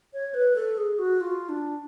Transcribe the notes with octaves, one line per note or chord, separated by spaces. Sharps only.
C#5
B4
A4
G#4
F#4
F4
D4